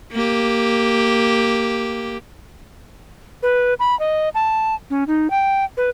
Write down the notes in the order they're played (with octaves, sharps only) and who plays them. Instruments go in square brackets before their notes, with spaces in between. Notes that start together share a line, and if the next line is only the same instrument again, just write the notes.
[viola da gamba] A#3 G4
[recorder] B4
B5
D#5
A5
C#4
D#4
G5
B4